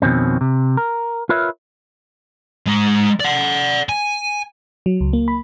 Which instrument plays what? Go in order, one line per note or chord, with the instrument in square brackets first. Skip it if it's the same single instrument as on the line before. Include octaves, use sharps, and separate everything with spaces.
[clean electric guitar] F2 B2 D#3 C4 C#4
C3
A#4
F4 A#4 B4 C#5 E5
[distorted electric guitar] G#3 C5
D5 F#5
G#5
[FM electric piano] F#3
C#2
A#3
B5